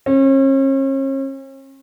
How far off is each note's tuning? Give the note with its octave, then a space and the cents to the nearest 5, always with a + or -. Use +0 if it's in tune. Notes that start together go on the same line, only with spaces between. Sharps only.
C#4 -40